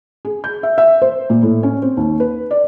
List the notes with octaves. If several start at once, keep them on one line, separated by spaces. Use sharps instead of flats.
G#4
G6
E5
E5
C5
A#2
A2
C#4
C4
D#2
B4
D5